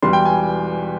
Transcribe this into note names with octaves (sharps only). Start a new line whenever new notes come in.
E1 E2 E3 G3 C6
G5
G#5